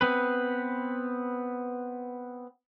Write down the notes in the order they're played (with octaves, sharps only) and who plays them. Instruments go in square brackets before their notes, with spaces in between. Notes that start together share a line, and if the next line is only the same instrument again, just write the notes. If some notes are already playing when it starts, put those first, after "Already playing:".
[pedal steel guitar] B3 C4 B4